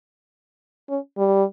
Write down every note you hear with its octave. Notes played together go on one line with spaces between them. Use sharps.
C#4
G3